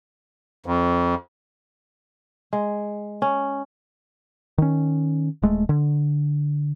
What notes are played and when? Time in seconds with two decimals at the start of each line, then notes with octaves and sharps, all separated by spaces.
0.66 F2
2.53 G#3
3.22 C#4
4.58 D#3 C#4
5.42 D#1 G#3 A3
5.69 D3